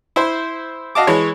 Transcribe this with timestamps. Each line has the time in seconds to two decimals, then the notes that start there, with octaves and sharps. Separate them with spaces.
0.16 E4 C5
0.95 F#4 D#5 F5 A5 D6
1.07 E3 G#3 C#5